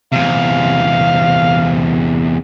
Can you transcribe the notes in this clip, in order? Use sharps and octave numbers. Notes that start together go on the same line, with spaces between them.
E2 C3 F5